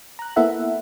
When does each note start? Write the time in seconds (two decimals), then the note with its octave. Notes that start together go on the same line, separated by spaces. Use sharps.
0.19 A#5 F#6
0.36 A#3 B3 E4 A4 E5 F#5